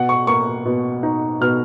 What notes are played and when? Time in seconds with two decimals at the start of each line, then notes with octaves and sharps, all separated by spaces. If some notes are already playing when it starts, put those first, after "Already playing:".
Already playing: B2 F#5
0.09 C#6
0.27 A#3 C#6
0.65 B2
1.03 D#4
1.41 B2 F6